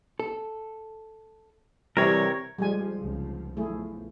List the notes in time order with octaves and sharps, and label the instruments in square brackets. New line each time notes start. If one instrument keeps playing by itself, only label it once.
[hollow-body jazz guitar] A4
[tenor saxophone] C3 [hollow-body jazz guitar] E3 G3 [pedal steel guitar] A#4 C#5
[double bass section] F3 [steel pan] G3 G#3 G#5
[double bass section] F1 C#2 F3
[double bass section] B1 F3 [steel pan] A3 E4 G#4